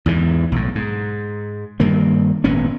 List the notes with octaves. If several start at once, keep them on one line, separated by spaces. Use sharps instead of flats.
E2 G#2 E3
B1 A2
G#2
G2 D#3 A#3
G#1 A#2 B3 C#4